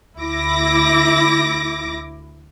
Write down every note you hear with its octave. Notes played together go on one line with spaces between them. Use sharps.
D2 E4 D6 A#6